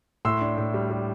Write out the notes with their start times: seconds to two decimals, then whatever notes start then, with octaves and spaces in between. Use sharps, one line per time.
0.25 A2 C6 E6
0.41 D4
0.58 A2
0.74 G3
0.90 G3